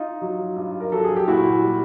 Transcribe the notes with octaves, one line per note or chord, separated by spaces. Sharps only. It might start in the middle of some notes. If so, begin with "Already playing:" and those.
Already playing: D#4 F4
F#3
G2
A#4
F#3 A4
G#4
G4
A#2 E4 F#4
G3